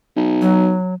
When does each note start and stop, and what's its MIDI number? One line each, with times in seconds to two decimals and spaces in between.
0.16 0.74 35
0.42 0.94 54